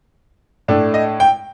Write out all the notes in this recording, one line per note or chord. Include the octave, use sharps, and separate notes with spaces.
A2 A3 D4
D#5
G5